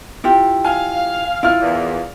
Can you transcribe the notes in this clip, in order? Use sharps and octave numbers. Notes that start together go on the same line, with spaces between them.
E4 F4 G4
F5 G#5
E4 F4 F6
E2 A#2